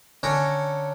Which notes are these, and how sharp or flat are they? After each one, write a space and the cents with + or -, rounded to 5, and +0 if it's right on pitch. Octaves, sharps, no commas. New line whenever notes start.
D3 +0 C#4 +0 A#5 +0